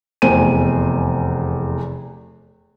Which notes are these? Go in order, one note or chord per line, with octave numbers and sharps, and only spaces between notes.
F1 E2 C5 G#5 D#7